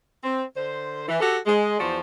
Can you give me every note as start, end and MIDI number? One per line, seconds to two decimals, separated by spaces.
0.23 0.43 60
0.56 1.05 50
0.56 1.05 72
1.07 1.18 52
1.20 1.36 66
1.20 1.36 67
1.20 1.36 69
1.45 1.78 56
1.79 1.99 40
1.79 1.99 53
1.79 1.99 66
1.79 1.99 72
1.79 1.99 74